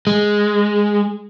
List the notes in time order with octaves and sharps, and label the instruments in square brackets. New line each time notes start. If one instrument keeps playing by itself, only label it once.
[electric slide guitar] G#3